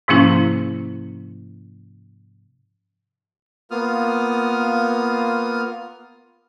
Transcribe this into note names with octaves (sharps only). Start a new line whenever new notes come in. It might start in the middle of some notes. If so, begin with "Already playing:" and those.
G#2 C3 F3 A#3 C#4 E4
A#3 B3 F4 D#6 F6